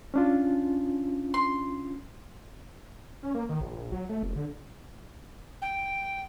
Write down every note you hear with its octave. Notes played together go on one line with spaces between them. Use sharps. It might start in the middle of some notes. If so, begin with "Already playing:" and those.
C#4 D4 F4
C6
C#4
A#3
D#3
A#1
F#3
A3
F1
D3
G5